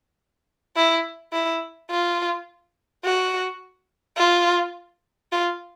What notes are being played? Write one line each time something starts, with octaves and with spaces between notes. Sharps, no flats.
E4
E4
F4
F#4
F4
F4